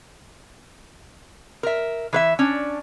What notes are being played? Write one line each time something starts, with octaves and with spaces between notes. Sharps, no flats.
A#4 E5
E3 B4 E5
C#4 D4